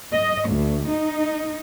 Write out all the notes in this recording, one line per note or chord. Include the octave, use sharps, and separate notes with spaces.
D#5
D2
D#4